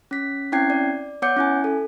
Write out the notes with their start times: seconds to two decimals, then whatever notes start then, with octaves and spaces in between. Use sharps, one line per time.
0.11 C#4 B6
0.52 C4 C#4 E4 G5 G#6 C7
0.70 D5
1.22 B3 C#5 F#5 D6 G6 C#7
1.37 C#4 E4 G#5
1.64 A4